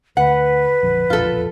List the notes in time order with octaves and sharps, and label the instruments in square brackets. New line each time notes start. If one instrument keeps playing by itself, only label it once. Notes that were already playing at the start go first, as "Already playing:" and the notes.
[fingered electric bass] D2 [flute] B4 [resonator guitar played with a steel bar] F#5
[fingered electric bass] A#1 F2
[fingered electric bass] E1 A#1 F2 [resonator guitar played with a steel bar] F4 A4